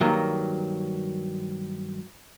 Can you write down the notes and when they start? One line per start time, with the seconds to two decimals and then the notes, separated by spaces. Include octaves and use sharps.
0.01 G2 D#3 F#3 A#3